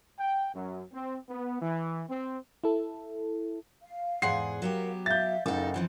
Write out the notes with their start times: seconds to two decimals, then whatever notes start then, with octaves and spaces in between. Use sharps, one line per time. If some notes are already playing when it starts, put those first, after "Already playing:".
0.19 G5
0.54 F#2
0.93 C4
1.29 B3
1.61 E3
2.09 C4
2.64 E4 A4
3.83 F5
4.22 E2 G#2 G#4 F#5 C6 C7
4.62 F#3 B3 G4 A#4 F5
5.06 E5 F5 G6 A6
5.46 F#1 D#4 A4 F5 F#5
5.74 E3 F3 C4